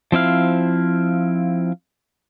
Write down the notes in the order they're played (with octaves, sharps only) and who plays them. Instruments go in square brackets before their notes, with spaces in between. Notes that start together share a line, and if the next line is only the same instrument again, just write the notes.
[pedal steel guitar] F3 C4 E4 F5